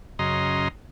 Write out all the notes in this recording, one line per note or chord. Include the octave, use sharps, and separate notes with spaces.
F#2 C#3 D#5 A#5 C6